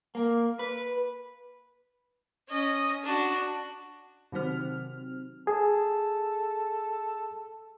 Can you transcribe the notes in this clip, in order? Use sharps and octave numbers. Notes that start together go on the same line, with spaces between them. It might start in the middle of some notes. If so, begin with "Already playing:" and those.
A#3
B4
C#4 D#5
D4 F#4
C3 D#3 F#3 C4 F6
G#4 A4